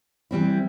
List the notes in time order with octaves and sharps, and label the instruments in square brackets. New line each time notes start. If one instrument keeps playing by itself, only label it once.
[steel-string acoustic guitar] E3 G3 C4 E4